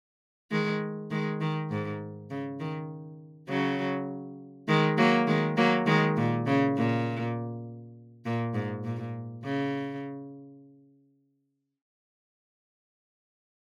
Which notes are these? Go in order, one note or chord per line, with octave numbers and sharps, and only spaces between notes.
D#3 G#3
D#3 G#3
D#3
G#2
C#3
D#3
C#3 F#3
D#3 G#3
F#3 A#3
D#3 G#3
F#3 A#3
D#3 G#3
A#2
C#3
A#2
A#2
G#2
A#2
C#3